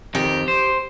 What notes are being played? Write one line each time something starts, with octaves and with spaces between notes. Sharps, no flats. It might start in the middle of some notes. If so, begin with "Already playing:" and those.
F2 D#3 G4
C5